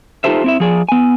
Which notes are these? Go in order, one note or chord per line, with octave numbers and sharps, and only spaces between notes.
D#4 F4 G4 A4 C5 E5
C4 E4 E5
F3 G#4 D5
B3 G#5